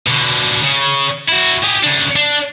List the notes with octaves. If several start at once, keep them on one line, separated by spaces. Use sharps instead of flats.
B2 D3
C#3
E4 F#4
G4 G#4
C#3 D4
D4